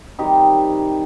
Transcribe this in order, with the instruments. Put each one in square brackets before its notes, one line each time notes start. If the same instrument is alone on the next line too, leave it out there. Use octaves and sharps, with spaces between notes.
[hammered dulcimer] C3 D#3 G3 D#4 G4